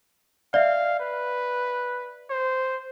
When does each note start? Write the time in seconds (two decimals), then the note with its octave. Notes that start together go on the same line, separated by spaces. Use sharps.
0.54 D5 E5 F5
1.00 B4
2.30 C5